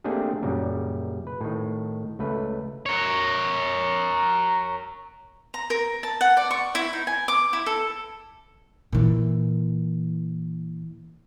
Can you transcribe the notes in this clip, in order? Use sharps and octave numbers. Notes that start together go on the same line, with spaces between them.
A3 A#3 C4 D4 G4 G#4
F#2 A#2 C#3 G3
B4
A2 D#3
C#2 A3 B4
A#4 C#5
A#5
A#4
A5
F#5
D5
C#6
E4
D#4
G#5
D6
E4
A4
A#2 E3